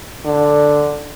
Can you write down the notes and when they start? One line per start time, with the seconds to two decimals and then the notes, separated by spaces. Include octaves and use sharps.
0.25 D3